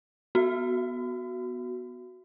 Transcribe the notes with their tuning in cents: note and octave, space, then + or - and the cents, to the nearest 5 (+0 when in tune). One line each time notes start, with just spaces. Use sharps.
B3 +0 F#4 +0